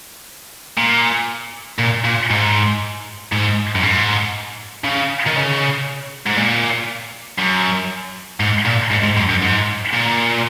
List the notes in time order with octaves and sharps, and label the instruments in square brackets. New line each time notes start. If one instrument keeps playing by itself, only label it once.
[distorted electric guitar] A#2
A#2
A#2
G#2
G#2
F#2
G#2
C#3
D#3
C#3
G#2
A#2
F#2
G#2
A#2
G#2
G#2
F#2
F#2
G#2
A#2